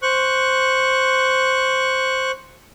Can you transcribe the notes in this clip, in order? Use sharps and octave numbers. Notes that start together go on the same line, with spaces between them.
C5 C#6 F#6